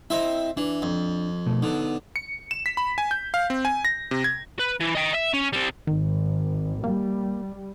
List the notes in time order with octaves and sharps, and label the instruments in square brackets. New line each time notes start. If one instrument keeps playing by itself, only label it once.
[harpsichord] C4 E5 [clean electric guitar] E4 D#5
[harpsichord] E3 [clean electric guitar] D4
[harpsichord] F2
[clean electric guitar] B2 A3
[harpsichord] D3 [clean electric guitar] B3 D#4
[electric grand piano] C#7
E7
B6
B5
G#5
G6
F5
C4
G#5
A#6
C3
G#6
[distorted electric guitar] B4
E3
D#5 G5
E5
C#4
G3 C4
[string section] G#1 [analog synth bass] D#3
[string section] G3 [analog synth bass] A#3